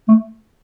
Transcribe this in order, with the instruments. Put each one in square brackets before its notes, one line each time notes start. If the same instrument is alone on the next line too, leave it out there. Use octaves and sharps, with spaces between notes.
[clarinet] A3